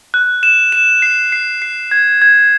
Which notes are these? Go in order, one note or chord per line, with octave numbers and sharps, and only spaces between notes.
F#6
E7
E7
C7
C7
C7
G#6
G#6